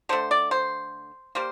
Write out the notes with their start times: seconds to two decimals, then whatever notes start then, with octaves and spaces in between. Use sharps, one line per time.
0.09 D3 A3 C5
0.31 D5
0.51 C5
1.35 G3 A#3 C5